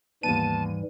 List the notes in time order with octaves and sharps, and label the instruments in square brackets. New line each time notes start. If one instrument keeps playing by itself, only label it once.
[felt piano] D#2 B3 [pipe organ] G#2 E3 G3 [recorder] A5 [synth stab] D#7